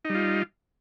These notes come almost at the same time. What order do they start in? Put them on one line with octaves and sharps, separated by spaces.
D#4 G3 F4